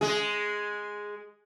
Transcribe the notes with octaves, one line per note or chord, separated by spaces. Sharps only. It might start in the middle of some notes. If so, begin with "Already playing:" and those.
G#3 G#4